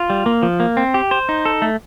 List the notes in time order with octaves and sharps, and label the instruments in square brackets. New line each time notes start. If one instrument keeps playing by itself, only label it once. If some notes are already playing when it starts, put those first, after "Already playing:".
Already playing: [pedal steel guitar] F4
G3
A#3
F3
A#3
C4
G4
C5
D#4
A4
A3